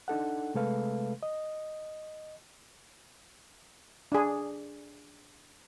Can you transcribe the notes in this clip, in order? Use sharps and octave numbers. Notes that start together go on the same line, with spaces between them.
D4 D#4 A4 F#5
C3 G#3 A3 A4 B4 F5
D#5
D4 G#4